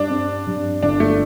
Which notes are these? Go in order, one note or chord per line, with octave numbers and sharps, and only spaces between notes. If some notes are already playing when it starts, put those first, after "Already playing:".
Already playing: G2 D4
C4
G2
G1 D4
A3